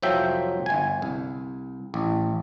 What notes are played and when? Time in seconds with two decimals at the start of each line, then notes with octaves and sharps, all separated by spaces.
0.02 C2 F2 F3 F#3 E5 G5
0.66 G1 G#5
1.02 C2
1.94 A1